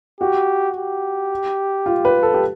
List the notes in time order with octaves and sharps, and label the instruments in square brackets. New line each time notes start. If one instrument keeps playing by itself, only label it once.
[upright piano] F#4 [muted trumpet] G4
[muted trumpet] G4
[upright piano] F4
B4
A4
G4